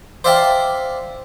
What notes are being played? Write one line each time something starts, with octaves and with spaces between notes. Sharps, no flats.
C5 D5 E5 F5 G5 A5